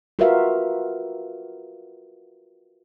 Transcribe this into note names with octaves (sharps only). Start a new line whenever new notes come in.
F4 F#4 A#4 B4 E5 F5